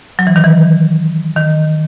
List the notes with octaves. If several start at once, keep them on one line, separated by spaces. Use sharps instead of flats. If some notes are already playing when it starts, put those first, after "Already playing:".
F#3
E3
D#3
E3
D#3